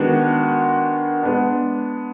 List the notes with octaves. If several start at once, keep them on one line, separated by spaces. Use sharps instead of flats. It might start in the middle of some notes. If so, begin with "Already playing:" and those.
Already playing: D#3 G#3 B3 D4 F#4
G#3 B3 D4